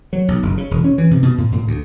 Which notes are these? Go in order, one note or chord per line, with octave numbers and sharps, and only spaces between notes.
F#3
B1
F#1
C#3
E1
C#4
E3
C3
B2
A2
A2
D2